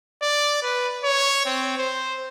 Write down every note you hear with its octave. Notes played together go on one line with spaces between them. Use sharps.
D5
B4
C#5
C4
C5